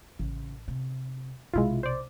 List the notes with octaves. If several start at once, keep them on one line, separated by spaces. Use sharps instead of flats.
A1 C#3
C3
B1 C3 G#3 E4 F4
C5 D5